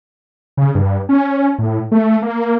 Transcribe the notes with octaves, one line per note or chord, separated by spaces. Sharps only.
C#3
G2
C#4
A2
A3
A#3